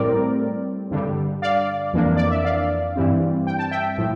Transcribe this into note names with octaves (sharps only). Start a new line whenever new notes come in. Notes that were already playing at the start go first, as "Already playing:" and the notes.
Already playing: A2 G3 C4 A#4 D5
G2 D3 G3
D5 F5
F2 E3 A#3 D4
D5
E5
D5 F5
G2 E3 G3 C4
G5
A5
E5 G5
A2 F3